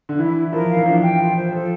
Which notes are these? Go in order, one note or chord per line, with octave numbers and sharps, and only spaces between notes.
D3
E3 E4
E4
F3 A#4
F5
E3
F3 D4
G5
F4
C5
F3 A4